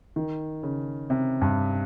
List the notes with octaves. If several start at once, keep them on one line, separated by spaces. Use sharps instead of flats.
D#3
C#3
C3
G2